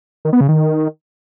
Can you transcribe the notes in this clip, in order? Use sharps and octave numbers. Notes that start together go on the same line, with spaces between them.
D#3
B3
C#3
D#3